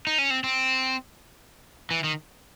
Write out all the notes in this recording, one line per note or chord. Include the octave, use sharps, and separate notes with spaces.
D#4
C#4
C4
C4
E3
D#3